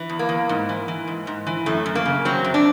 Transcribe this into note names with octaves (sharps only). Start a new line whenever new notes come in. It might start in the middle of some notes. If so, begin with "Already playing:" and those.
Already playing: E3
E2
A#3
E2
G#2
E3
E3
G#2
G#2
E3
F#2 A3
F#2
A#3
C#3
F#3 C4
F#2
D4